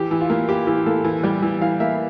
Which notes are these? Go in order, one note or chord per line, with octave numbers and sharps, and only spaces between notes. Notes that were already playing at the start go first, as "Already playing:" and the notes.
Already playing: E3 G4
E3
F4
A#3
E4 G4
E3 G4
A#3 A4
E3
G3 G4
E3
E3 F5
A#3 E5